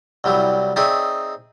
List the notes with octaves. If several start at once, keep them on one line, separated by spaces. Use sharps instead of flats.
C2 F#3 G3 E4
C4 D#4 G#4 C#5 D5 E5